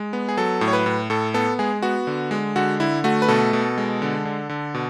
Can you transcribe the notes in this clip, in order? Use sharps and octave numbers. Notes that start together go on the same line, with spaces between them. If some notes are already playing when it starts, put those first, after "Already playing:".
Already playing: G#3
B3
G#4
F#3 A4
A2
C#5
B4
A2
A2 A4
B3 A4
G#3 G#4
B3 F#4
D3
G#3
D3 F#4
D3 E4
A3 F#4
B4
B2 A4
B2
G#3
D3
D3
D3
B2